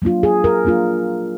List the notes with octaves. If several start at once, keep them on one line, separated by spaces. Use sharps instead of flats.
F#3 A#3 D4 F4
G#4
A#4
F#3 A#3 D4 F4